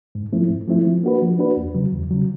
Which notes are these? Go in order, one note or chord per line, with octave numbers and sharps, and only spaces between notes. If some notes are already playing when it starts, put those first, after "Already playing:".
G#2
F3 A3 C4 E4
G#2
F3 A3 C4 E4
F3
A#3 D4 F#4 B4
F3
A#3 D4 F#4 B4
E2
C#3 F#3
E2
C#3 F#3